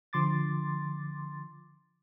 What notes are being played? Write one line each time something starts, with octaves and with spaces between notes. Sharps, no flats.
D3 F3 C6 D6 A6